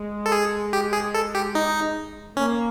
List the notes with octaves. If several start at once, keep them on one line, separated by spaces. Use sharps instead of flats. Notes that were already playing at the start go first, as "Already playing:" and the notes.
Already playing: G#3
A4
G#4
G4
G#4
A4
G4
D#4
A#3 C#4